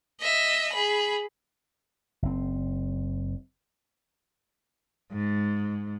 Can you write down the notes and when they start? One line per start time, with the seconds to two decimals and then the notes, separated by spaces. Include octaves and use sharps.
0.20 D#5 E5
0.72 G#4 B5
2.22 F#1 C4
5.11 G#2